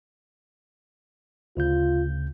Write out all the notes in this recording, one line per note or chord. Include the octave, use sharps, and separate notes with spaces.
D2 C#3 F4 G6